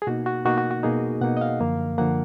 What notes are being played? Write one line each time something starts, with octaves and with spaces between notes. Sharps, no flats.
G#4
B2 A#3 D#4 F#4
F#4
B2 A#3 D#4 F#4
F#4
F#4
B2 A#3 D#4 G#4
B2 A#3 D#4 F#5
D#5
F5
F#2 D3 F3 A#3
D3 F3 A#3 F#5